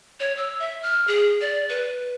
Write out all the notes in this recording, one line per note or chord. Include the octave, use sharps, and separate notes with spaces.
C#5
E6
E5
F6
G#4
D5
B4